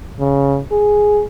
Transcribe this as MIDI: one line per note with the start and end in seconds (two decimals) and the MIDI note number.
0.19 0.59 49
0.72 1.23 68